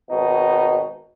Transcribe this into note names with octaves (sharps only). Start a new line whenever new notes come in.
G#1 B2 D#4